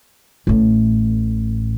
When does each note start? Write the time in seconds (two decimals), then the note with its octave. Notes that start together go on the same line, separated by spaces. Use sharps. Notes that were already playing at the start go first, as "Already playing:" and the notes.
0.47 A1 A2